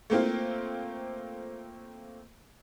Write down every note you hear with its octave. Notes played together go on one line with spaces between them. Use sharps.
A3 A#3 C4 F4